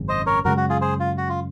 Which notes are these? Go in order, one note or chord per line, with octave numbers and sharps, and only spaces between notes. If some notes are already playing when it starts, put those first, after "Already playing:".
Already playing: G#1 F#2 C#3
C5 D#5
A#4 C#5
F#2 C#3 G#3 F#4 A#4
F#4
F4 G#4
G#4 C5
F4
F#4
F4